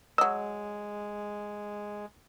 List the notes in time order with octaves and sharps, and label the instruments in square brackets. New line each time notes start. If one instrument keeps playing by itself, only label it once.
[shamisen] F#3 D#5 [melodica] G#3 [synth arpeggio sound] E6